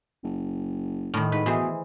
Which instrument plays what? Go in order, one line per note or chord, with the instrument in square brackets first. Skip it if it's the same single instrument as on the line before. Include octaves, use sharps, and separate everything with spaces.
[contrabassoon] F#1
[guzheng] A2 D#3
[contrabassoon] G#2 [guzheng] B4
[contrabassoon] B2 [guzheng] E3 G#4 C5